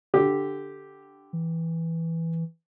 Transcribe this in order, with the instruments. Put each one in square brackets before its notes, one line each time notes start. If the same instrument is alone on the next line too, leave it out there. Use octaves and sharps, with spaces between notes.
[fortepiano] D3 G4
[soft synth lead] E3